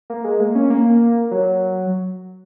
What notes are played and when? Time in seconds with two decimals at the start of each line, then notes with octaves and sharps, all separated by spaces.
0.10 A#3
0.24 G#3
0.40 A#3
0.55 C#4
0.70 A#3
1.31 F#3